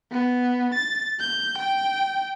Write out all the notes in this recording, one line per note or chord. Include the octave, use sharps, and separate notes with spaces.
B3
A6
G6
G5